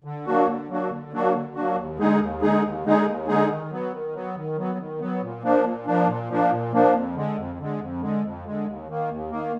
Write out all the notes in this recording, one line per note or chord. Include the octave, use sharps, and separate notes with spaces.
D3
F#3 A#3 D4 F#4
D3
F#3 A#3 D4 F#4
D3
F#3 A#3 D4 F#4
D3
F#3 A#3 D4 F#4
D#2
D3 G#3 D#4 G#4
D#2
D3 G#3 D#4 G#4
D#2
D3 G#3 D#4 G#4
D#2
D3 G#3 D#4 G#4
D#3
F#3 B3
D#3
F#3 B3
D#3
F#3 B3
D#3
F#3 B3
A#2
F3 A#3 D4
A#2
F3 A#3 D4
A#2
F3 A#3 D4
A#2
F3 A#3 D4
F2
D3 G#3
F2
D3 G#3
F2
D3 G#3
F2
D3 G#3
D#2
D#3 A#3
D#2
D#3 A#3